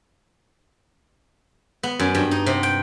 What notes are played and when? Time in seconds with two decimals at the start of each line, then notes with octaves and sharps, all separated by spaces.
1.83 B3
1.99 F#2
2.15 G2
2.31 D#4
2.46 C3
2.63 G5